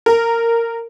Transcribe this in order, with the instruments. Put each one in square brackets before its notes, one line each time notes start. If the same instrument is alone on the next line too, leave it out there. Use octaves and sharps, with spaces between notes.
[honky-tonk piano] A#4